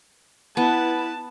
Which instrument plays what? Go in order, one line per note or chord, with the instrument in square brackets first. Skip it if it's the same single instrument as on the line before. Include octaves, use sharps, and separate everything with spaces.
[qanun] B3 [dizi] E4 [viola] B4 A5